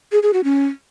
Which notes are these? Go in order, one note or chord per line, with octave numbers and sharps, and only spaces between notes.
G#4
G#4
F#4
C#4